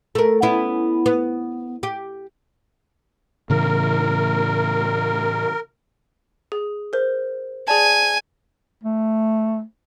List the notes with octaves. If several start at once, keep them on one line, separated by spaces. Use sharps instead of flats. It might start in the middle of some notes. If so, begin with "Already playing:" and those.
A3 A#4
B3 C#4 E4
B3
G4
A2 C#3 E3 A#4
G#4
A#4 C5
G#4 D5 G#5 A5
A3